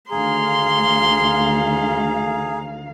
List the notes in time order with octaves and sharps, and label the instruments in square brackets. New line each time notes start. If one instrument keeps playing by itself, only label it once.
[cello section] D2 D#3 F5 [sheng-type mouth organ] G#4 [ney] A#5 [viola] C6